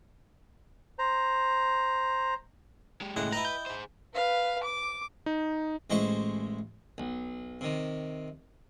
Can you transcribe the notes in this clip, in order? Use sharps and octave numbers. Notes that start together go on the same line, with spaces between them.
C5 A#5
G#3 G4
D#2 A2 C#3 G#3 F#5 G5
E4 B4 D#5 G5 A#5
G6
G#4 C5
B4 F5
D6
D#4
A1 G#3 E4 C5 C#6
B1
C3 D#3